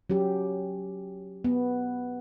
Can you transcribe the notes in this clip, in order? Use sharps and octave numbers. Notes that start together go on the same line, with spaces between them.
F#3 C#4 G4
B3